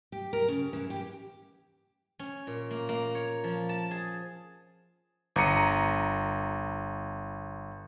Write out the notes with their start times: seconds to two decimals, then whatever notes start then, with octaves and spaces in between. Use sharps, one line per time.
0.12 G4
0.33 A#4
0.49 C#3
0.73 E3
0.90 G4
2.19 C#4
2.47 A#2
2.71 A#3
2.89 A#3
3.15 C#5
3.44 F3
3.69 A5
3.91 G#4
5.36 G1 A#5 C#7 D#7